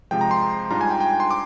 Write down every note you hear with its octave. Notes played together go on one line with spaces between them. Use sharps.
C3 F3 G#3 G5
A#5
C6
G#2 G3 D4 F4 A#5
G#5
G5
G5
C6
D6